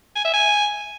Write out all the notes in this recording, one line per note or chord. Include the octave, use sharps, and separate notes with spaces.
G#5
E5
G#5